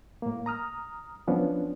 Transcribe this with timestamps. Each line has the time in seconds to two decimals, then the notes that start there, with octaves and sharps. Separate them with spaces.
0.22 A2 A#3
0.46 A#5 D#6 F6
1.27 F3 B3 C#4 D4